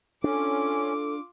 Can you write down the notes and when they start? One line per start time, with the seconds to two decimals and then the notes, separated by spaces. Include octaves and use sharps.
0.24 C#4 D4 F4 A4 D6